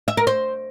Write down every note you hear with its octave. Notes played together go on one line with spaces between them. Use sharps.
E5
A#4
C5